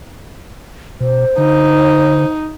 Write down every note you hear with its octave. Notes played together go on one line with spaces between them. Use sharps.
B2 C5
D3 D#4